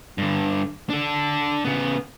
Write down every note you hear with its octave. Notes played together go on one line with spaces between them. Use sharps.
G2 D3
D4 A4
C#3 B3